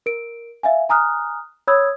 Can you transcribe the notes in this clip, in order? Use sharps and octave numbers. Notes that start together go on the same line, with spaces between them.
A#4 D7
E5 F5 G#5
G#5 A#5 D#6 F6 F#6
C#5 B5 D#6 E6 G#6